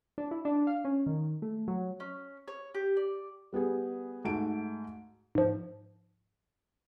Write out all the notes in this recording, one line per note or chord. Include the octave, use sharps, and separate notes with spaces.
D4
E4
D4
F5
C#4
D#3
A3
F#3
C#4
C#5
G4
D5
G3 B3 G4 G#4
G#2 A3 F#4 D7
G#2 F3